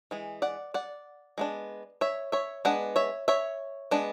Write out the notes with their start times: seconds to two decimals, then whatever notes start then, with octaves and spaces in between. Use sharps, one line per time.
0.11 E3 G#3
0.42 D5 F#5
0.74 D5 F#5
1.38 G#3 B3 D4
2.01 C#5 E5
2.32 C#5 E5
2.65 G#3 B3 D4 F#5
2.96 C#5 E5
3.28 C#5 E5
3.91 G#3 B3 D4